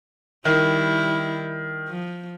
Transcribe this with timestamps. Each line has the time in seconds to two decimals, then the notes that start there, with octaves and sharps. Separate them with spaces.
0.45 D#3 G3 E4
1.89 F3